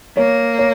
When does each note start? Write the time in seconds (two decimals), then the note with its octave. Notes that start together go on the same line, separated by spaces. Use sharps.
0.17 A#3 C#5
0.59 C#5